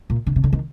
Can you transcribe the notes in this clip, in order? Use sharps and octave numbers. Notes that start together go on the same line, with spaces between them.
A#2
D3
C3
D3
D#3